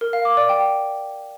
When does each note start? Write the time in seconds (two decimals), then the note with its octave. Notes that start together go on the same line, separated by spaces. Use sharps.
0.01 A#4
0.13 F5
0.25 D6
0.37 D5
0.49 G5